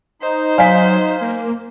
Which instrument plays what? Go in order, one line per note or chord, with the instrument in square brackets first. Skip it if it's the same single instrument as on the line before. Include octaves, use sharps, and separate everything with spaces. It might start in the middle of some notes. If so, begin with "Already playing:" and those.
[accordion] D#4 [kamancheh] C5
[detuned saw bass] F#3 [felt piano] F5 G#5 B6
[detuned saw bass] A#3